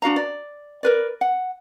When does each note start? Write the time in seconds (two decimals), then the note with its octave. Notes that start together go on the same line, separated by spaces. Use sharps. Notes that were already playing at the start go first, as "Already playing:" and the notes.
0.02 D4 F#4 F5 A#5
0.16 D5
0.83 A#4 B4 D5
1.21 F#5